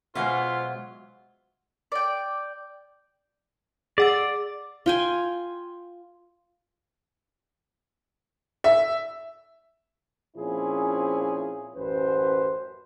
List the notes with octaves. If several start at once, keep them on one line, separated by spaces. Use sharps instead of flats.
B2 F#3 G#3 F4 C5 E5 F#5
D5 G5
G#4 D5 F#5 E6
F4 G5 G#5
E5
A#2 F3 C4 C#4 E4 G#4
A1 F#2 B4 C5